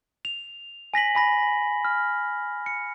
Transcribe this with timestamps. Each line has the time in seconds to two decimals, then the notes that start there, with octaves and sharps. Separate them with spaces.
0.25 F7
0.94 G#5 A#6 B6 F#7
1.15 G#5 B5 A#6
1.85 F6
2.66 C#7